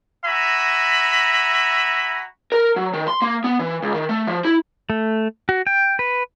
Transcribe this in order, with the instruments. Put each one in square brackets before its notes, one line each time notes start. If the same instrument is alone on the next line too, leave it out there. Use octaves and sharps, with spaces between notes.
[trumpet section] F#4 E5 G#5 A#5 B5
[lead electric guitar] A#4
F#3
D#3
C6
A#3
B3
E3
C#2
D#3
A3
F3
E4
[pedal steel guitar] A3
F#4
G5
B4